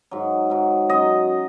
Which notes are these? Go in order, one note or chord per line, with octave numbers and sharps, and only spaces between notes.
G#2 F#3
G#2 F#3
F#2 F#3 D#5